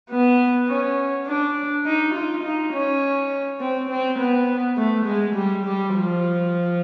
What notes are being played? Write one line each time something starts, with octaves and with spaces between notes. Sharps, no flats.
B3
C#4
D4
D#4
F4
D#4
C#4
C4
C4
B3
A3
G#3
G3
G3
F3